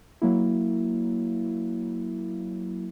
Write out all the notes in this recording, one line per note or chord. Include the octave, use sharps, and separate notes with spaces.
F#3 A#3 E4